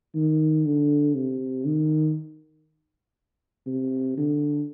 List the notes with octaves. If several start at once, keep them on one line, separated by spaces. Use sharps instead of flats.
D#3
D3
C3
D#3
C3
D3